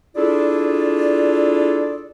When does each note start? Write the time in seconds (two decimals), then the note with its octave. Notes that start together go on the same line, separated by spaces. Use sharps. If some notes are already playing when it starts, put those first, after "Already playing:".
0.16 D4 E4 F4 G#4 A4 D5